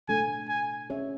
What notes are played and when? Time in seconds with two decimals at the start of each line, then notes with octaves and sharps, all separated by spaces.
0.08 B2 A3 D4 A4 G#5
0.49 G#5
0.90 C#4 G#4 C#5 E5